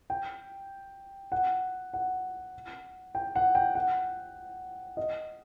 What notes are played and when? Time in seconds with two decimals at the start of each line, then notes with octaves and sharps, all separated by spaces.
0.10 G5
1.32 F#5
1.93 F#5
3.15 G5
3.35 F#5
3.55 G5
3.75 F#5
4.97 D#5